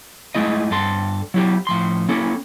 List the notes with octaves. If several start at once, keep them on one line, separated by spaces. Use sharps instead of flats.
G#3 A3 E4 D#5
G2 A4 C6
F#3 E4 G4
A2 F3 C6
A#3 C#4 E4 A4